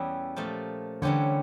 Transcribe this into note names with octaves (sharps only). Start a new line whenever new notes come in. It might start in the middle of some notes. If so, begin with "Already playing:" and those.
Already playing: E2 E3 G3 C#4
A#2 F3 A3
D3 E3 G3 C#4 G4 C#5